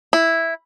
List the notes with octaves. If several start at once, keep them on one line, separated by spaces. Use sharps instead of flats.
E4